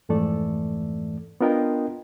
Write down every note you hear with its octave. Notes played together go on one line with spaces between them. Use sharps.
F2 G#2 E3 A3 A4 D5
B3 D4 F4 A#4 D#5 G5